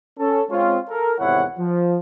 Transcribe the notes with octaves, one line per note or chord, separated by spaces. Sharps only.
C#4 A4
G#3 C4 C#4 F4
A4 A#4
G#1 E2 C3 E4 C#5 F#5
F3